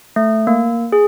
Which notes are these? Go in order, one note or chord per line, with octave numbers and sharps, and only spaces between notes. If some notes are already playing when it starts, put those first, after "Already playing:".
A3
A#3
G#4